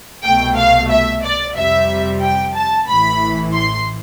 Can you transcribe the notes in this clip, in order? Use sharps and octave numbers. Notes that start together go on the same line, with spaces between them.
C2 B2 A3 G5
F5
E5
D5
F2 C3 G3 E5
G5
A5
A1 A2 E3 B5
C6